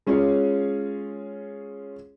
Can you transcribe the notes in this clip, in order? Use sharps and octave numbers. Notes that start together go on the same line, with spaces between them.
G#3 C#4 F4 G#4 C#5